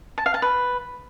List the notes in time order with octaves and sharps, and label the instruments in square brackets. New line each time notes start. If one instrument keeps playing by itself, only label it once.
[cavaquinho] A5
F5
A5
B4